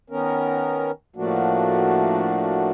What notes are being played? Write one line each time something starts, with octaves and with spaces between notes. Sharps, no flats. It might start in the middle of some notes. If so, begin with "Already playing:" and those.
D#3 B3 C#4 A#4
A2 F3 A3 A#3 D4 F#4